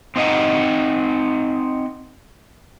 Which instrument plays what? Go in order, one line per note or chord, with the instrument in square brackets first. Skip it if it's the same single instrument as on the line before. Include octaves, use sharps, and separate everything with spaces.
[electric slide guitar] C4 D#4 D#5 F#5